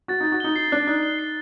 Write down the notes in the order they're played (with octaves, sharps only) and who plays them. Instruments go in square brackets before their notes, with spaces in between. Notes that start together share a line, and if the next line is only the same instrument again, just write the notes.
[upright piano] F#4 [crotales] A6
[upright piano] D#4 [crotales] A6
[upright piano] F#4
[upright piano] D#4 [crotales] G7
[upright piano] D#4 [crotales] C7
[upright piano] D4 [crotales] F#6
[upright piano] D#4 [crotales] F#6
[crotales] G7
C7